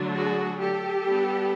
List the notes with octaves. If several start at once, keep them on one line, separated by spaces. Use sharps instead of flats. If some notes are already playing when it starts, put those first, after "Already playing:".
Already playing: D3 F#3 A3 D4
F#4 G#4
G4 A4
G3 B3 D4